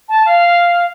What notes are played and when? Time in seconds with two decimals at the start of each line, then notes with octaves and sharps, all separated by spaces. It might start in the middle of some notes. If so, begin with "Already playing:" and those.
0.09 A5
0.26 F5